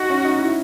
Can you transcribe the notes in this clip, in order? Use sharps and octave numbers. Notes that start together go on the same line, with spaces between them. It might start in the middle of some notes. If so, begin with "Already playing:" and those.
Already playing: D#4 F#4
C#4
D#4
E4